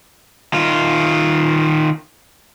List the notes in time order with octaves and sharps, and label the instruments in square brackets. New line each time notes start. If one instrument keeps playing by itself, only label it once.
[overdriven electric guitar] D#3 F4